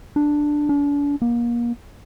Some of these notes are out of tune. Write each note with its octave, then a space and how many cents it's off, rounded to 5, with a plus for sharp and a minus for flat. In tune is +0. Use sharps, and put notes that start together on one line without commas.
D4 +5
D4 -40
A#3 +30